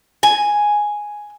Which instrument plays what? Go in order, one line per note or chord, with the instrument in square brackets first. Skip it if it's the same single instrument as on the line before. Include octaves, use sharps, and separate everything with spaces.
[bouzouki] G#5